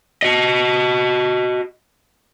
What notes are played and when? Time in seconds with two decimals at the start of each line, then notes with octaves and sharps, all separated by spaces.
0.22 F#4 D#5